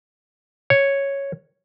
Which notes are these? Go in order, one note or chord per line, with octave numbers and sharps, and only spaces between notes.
C#5